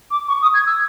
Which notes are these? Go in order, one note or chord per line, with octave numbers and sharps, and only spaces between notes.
D6
C#6
D#6
G#6
E6